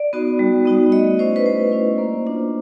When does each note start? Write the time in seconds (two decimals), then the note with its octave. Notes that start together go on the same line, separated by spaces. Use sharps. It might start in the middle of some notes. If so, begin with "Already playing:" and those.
Already playing: D5
0.13 B3 D#4 F#4
0.39 G3
0.65 B3 D#4 F#4
0.92 A3 D#5
1.19 C#4 E4 C5
1.36 B4
1.46 A3 C5
1.72 C#4 E4
1.98 A#3
2.25 D4 F4